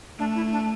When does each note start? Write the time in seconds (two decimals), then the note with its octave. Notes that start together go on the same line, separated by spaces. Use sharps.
0.19 A3 D4
0.35 E4
0.52 D4